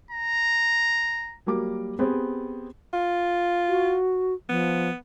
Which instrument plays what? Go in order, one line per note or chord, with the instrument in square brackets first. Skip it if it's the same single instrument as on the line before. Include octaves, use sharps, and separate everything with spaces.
[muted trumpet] A#5
[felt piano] F#3 G3 A#3 D6
B3 C4 G4 G#4
[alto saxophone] F4
[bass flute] F#4
[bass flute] F3 [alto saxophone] B3